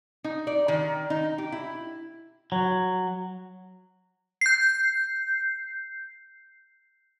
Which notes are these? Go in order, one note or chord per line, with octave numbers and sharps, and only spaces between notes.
D#4
D5
D#3
D#4
G4
E4
F#3
G6 C7